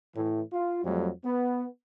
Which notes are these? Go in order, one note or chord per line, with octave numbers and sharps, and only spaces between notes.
A2 E3
F4
F2 F#3 G3 A3
B3